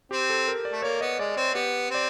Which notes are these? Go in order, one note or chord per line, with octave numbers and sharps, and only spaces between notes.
C4 G4
A4
A#4
D5
A3
A#3 C#5
B3 D#5
G#3 D5
C4 C#5
B3 G4
C4 D5